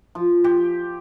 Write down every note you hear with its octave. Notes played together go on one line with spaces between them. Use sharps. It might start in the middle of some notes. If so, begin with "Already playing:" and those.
F3
G4